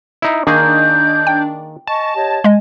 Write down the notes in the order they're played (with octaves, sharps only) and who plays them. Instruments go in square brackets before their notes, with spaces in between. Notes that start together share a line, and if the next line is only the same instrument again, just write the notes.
[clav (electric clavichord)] D#4 E4
[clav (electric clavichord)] D#3 A#3 G#4 [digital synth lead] D4 [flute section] D#4 G6
[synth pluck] G5
[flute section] D#5 G#5 C#6 [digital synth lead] A5
[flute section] G4 C#5 D#5
[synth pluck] G#3 D#5 [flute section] G#5